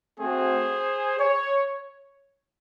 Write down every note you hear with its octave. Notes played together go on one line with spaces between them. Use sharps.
A3 C4 F#4 G#4 C5
C#5